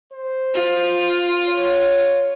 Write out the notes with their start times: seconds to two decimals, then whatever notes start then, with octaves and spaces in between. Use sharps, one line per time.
0.13 C5
0.54 F4
1.47 C#5